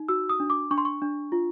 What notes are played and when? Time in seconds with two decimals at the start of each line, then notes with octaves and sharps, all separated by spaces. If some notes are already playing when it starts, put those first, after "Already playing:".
Already playing: D#4
0.09 F#4 E6
0.29 D#6
0.40 D4
0.50 D6
0.71 D4 C#6
0.78 C6
0.85 C#6
1.02 D4
1.32 F4